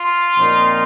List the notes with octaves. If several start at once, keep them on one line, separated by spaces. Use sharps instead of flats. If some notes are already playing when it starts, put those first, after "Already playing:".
Already playing: F4
A#2 F3 C4 D#4